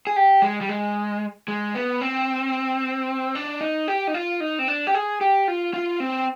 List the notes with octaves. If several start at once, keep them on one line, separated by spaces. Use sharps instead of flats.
G#4
G4
G#3
G3
G#3
G#3
B3
C4
D4
D#4
G4
D#4
F4
D#4
C4
D4
G4
G#4
G4
F4
F4
C4